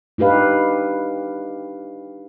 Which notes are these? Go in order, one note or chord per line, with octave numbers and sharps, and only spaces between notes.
D4 D#4 G4 B4 F5